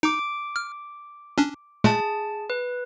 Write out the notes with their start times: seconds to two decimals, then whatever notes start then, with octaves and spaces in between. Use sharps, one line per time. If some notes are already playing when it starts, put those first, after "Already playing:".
0.03 D#4 D6 D7
0.56 F6
1.38 C#4 D4
1.84 A#2 G#3 A3 G#4 A5
2.50 B4